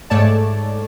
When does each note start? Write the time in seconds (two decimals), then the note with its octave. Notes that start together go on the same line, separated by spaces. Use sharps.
0.10 G#2 A3 C#5 D5 A5